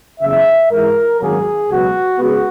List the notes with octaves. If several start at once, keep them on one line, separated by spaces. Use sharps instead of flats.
F#1 E2 C#3 E5
G#2 E3 G#3 A#4
G#1 F#2 D#3 F#3 A#3 G#4
C#2 B2 F#3 B3 F#4
C#3 G#3 B3 F#4